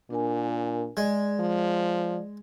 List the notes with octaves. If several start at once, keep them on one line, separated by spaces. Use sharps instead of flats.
A#2 D4 A#4 G#5
G#3 D5
F3